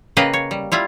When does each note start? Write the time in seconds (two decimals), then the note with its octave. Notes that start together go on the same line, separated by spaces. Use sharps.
0.17 C#3 A#3 B4 D#5 F5 G5
0.34 C#5
0.51 G3
0.72 G3 E4 F4